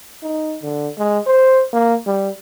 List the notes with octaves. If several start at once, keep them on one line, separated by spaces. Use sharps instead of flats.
D#4
D3
G#3
C5
A#3
G3